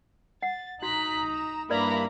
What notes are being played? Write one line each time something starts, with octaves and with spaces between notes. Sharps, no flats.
F#5 A6
D#4 F#4 A#5 F#6 B6
E7
G2 A#3 E4 A#4 B4 D5 A#5 B5